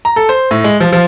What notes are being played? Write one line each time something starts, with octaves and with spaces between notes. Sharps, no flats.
A#5
A4
C5
A2
G#3
F3
F3